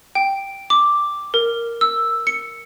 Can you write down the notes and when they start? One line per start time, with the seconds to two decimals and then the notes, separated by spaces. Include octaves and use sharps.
0.15 G5
0.70 D6
1.34 A#4
1.81 E6
2.27 C#7